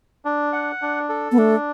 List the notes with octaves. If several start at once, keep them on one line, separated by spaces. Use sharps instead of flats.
D4
F#5
D4
A4
B3
A3 D4